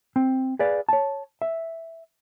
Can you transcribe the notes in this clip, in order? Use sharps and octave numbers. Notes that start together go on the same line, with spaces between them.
C4
G#4 B4 D5 F5
C#5 A5
E5